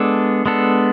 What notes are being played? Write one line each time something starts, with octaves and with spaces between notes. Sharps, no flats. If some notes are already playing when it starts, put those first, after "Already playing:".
Already playing: G#3 B3 D4 A4
G#3 B3 D4 A4